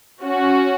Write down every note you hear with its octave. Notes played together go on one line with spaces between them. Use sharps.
C#4 F#4